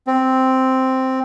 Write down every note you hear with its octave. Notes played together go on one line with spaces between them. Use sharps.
C4